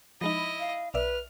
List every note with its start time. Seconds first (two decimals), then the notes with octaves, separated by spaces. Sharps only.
0.21 F3 G#3 D#4 E4 D#5 B5
0.60 F5
0.94 B1 B4 D5 E5 F6